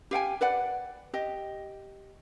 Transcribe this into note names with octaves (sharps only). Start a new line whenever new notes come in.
G4 F5 G5 G#5
B4 D5 F#5
G4 D#5